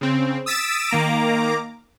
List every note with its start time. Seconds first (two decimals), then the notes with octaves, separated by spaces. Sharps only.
0.01 C#3 C4
0.46 D#6 E6 A6 B6 D7 E7
0.89 D#3 A#3 A#5 D6